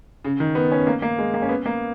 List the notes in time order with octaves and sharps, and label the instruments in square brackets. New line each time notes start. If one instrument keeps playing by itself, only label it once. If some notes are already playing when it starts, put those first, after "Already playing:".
[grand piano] C#3
D#3
B3
C#4
A#3
A#3
G#3
A#3
C#4
B3
A#3